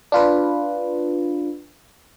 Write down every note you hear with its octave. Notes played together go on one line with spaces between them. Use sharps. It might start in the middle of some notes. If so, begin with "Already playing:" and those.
D4 F4 B4